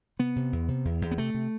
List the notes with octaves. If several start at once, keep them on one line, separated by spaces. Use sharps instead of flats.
C3 B3
C3
E2
C3
E2
E2
B3
C3 A3
C3